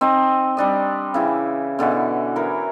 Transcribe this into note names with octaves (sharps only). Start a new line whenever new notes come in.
C4 D#4 D#5
G3 D4 D#5
C#3 E3 E4
B2 D3 E3 F#4
E3 A#4